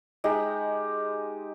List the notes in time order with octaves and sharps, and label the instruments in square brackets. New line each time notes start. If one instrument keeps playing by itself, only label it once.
[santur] G#3 D#4 G4